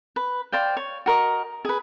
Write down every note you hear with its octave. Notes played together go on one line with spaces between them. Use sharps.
B4
C5 D5 F5 G5
C#5
F#4 A#4 D#5
G#4 B4